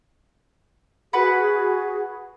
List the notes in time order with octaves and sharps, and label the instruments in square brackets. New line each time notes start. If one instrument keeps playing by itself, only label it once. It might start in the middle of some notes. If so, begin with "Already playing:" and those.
[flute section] F#4 G#4 [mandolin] B4 F#5 B5